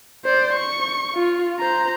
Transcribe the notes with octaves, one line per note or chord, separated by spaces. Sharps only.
C5 D5
C#6
F4
C5 A#5